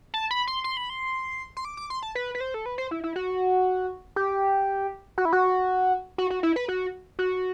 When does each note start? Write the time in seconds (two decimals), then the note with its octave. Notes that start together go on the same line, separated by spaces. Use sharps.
0.14 A5
0.31 B5
0.48 C6
0.64 C6
0.77 B5
0.90 C6
1.57 C6
1.65 D6
1.77 D6
1.90 C6
2.03 A5
2.15 B4
2.35 B4
2.40 C5
2.54 A4
2.66 B4
2.78 C5
2.91 E4
3.04 E4
3.16 F#4
4.16 G4
5.18 F#4
5.25 E4
5.33 F#4
6.18 F#4
6.30 F#4
6.43 E4
6.56 B4
6.68 F#4
7.19 F#4